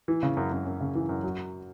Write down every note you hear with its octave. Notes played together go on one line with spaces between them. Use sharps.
E3
C#3
F#2
F#2
F#2
C#3
E3
F#2
F#3